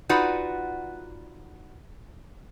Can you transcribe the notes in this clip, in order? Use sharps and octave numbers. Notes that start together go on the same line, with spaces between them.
D#4 F4 F#4 B4 D5 F#5